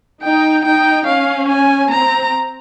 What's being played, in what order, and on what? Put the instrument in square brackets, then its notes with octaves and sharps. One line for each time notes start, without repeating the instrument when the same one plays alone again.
[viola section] D#4 [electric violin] G5
[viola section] D#4 [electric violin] G5
[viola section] C#4 [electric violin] F5
[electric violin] G#5
[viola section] C4 [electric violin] A#5